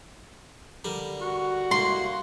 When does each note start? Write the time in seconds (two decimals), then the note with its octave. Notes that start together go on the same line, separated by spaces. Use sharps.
0.84 D3 G3 A#4
1.21 F#4
1.71 C2 A#3 C6